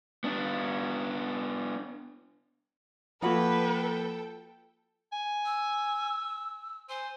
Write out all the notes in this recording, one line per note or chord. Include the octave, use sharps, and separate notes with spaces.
B3 D4
F3 A#3 F4 F#4 A4 B4 G5 B5
G#5
E6
C5 G#5